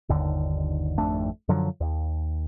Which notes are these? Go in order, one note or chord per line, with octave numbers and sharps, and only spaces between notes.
G1 D#2 D3 D#3
G#1 F2 A3 D4
F#2 D3 F3 F#3
D#2